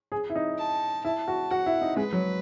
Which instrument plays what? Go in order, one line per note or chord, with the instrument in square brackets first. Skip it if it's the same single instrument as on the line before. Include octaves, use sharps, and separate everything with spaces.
[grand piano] G#4
E4
D#4
[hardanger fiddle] A5
[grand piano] E4 [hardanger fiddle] A5
[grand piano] F#4
[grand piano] F#4 [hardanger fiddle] F#5
[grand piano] E4
D#4
[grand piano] G#3 [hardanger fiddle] B4
[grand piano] F#3